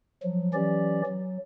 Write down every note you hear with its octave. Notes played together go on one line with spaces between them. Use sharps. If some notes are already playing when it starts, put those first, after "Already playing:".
F3 F#3
E3 F#3 C#4 G4 D5
F#3